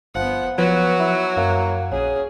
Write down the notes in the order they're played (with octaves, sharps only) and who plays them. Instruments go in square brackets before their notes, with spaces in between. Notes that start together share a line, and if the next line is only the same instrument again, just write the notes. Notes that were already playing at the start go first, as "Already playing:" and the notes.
[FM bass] G1 [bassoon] F3 [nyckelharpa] B3 F#5
[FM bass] F3 [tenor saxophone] F#3 [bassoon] B3 [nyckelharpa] F#4
[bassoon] E4
[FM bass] F#2 [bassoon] A#3
[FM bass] A#1 [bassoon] C#4 [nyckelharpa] G#4